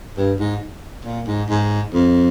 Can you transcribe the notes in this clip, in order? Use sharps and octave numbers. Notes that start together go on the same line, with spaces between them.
G2
G#2
A#2
G#2
G#2
F2